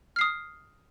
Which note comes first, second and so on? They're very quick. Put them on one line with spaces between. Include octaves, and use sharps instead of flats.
F6 C7 D#6